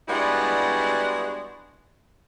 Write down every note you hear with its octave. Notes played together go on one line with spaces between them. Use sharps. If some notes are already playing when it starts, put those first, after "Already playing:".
G3 G#3 B3 D4 E4 F#4